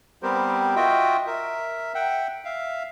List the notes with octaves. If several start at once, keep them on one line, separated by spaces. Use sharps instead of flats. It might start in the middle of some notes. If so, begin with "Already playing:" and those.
G3 B3 C4 G4 A#4 C5
F4 F#4 D#5 E5 G5
A#4 E5
E5 F#5 G5
E5 F5